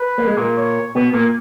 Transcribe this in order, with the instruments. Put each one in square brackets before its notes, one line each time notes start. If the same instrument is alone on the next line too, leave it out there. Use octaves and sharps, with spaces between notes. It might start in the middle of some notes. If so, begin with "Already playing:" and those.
Already playing: [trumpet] B4
[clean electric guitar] A#3
G#3
A#2 A#3
[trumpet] C#5
[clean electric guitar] B2 B3
A#2 A#3